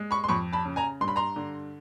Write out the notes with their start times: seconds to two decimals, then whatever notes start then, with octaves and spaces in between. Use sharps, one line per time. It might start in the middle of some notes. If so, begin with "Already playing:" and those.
Already playing: G#3
0.11 B5 C#6
0.24 C6
0.28 F2 B5 C#6
0.53 A5 B5
0.65 C#3
0.76 G#5 A#5
1.01 G2 C6
1.08 B5
1.16 A#5 C6
1.36 D3